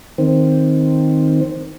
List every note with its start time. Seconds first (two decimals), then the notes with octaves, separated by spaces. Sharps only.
0.18 D#3 C4